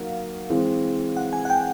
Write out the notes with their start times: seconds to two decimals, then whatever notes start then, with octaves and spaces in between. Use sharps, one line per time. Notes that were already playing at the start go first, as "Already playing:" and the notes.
Already playing: F#3 A#3 D#4 F#4 A#4 F5 F#5
0.50 E3 G#3 C4
1.17 F#5
1.33 G#5
1.45 F#5
1.50 G5